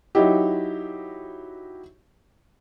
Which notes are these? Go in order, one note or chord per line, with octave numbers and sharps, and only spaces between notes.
F#3 D#4 E4 G4